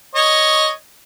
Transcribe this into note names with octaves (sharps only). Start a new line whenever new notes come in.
C#5 D#5